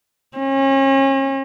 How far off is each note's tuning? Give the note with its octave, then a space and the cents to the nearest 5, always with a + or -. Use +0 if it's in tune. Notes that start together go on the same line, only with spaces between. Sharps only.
C#4 -35